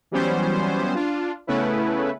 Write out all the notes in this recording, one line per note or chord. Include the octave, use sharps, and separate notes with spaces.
E3 F#3 G3 B3 C#4 C5
D4 F4
C#3 A3 B3 C#4 E4 B4